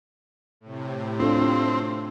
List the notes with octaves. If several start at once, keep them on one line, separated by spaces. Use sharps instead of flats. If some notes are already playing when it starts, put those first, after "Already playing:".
A2 C3
C4 D4 F4 A4